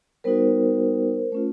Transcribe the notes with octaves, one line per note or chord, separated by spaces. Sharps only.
G3 B3 D#4 F#4 A#4 C5
A3 C#4 F4